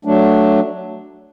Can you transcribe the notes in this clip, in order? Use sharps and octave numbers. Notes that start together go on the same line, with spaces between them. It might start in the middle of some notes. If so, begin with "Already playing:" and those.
F#3 A3 D4